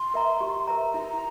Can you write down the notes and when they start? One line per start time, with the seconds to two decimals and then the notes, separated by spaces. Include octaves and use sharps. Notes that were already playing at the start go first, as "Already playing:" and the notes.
Already playing: C6
0.14 A#4 E5 A#5
0.41 G4
0.67 A#4 E5 A#5
0.94 E4 A#5